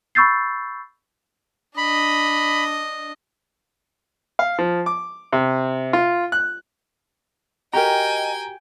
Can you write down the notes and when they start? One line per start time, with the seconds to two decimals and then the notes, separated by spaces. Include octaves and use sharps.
0.15 B5 C#6 E6 G6 A6 C7
1.77 D4 D#5 B5
4.39 F5
4.58 F3
4.86 D6
5.33 C3
5.93 F4
6.32 F#6
7.74 F#4 G4 A#4 D#5 G5 G#5 A#5